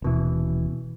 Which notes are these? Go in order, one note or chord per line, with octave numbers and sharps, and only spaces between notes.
D#1 B2 E3